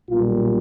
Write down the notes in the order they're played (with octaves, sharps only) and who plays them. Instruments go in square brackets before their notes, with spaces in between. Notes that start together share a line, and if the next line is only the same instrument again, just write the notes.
[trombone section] B1 A#2 G3 F4